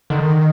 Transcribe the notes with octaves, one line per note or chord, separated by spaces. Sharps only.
D3 D#3